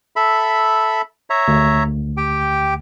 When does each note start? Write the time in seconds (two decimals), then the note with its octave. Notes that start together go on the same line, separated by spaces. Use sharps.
0.16 A4 E5 B5
1.30 C#5 E5 A#5
1.48 D2
2.17 G4 G5